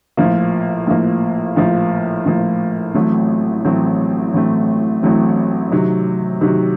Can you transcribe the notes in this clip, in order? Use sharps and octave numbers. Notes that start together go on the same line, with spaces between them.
A#1 A2 F3 A#3
A#1 A2 F3 A#3
A#1 A2 F3 A#3
A#1 A2 F3 A#3
A1 A2 F#3 A3 C4
A1 A2 F#3 A3 C4
A1 A2 F#3 A3 C4
A1 A2 F#3 A3 C4
C3 D#3 F#3
C3 D#3 F#3